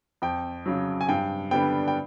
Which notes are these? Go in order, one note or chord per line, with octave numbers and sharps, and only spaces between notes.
F2 G5
C#3 F#3
G#5
G2 G5
D3 G3 B3 G5
G5